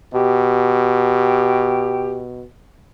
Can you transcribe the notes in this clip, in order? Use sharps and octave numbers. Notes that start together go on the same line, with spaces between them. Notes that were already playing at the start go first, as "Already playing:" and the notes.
B2 G4